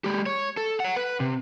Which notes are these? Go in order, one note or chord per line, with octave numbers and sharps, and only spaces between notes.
G#3 G4
C#5
A4
C#5 F#5
B4
C3